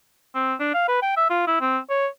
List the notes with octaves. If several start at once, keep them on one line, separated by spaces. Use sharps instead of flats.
C4
D4
F5
B4
G5
E5
F4
E4
C4
C#5